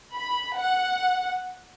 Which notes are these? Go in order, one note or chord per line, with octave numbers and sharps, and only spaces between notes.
B5
F#5